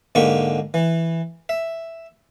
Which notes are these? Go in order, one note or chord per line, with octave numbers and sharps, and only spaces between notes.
G#2 D3 A#3 G4 C#6
E3
E5